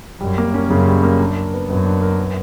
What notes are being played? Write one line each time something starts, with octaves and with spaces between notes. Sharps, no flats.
F#2 G3
A#3
C#4
F#2 C#3
G3
A#3
D4
A#4
B3
F#2 B3
D4
A#4
B3